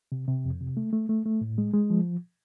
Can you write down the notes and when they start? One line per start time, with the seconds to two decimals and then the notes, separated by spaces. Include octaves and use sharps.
0.12 C3
0.28 C3
0.45 F2
0.60 C3
0.77 A3
0.93 A3
1.09 A3
1.25 A3
1.41 A2
1.58 G#3
1.74 G#3
1.90 F3